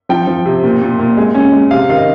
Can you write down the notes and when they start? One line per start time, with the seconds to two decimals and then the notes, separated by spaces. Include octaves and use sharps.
0.09 F3 G5
0.27 F3
0.45 C3
0.64 A#2
0.82 A#2
0.99 A#2
1.17 G#3
1.34 C#4
1.52 G#3
1.71 C3 F5
1.89 D#3 F5
1.97 D#5